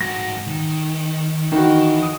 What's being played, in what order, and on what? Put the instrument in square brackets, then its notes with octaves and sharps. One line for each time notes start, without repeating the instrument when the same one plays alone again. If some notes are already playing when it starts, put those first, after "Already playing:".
[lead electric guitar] G#2 F#4 [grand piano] A#6
[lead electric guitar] D#3
[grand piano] D#3 F#4 [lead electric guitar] E3
[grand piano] D#6